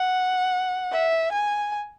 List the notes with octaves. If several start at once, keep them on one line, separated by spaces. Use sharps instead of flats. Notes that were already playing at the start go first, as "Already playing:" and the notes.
Already playing: F#5
E5
G#5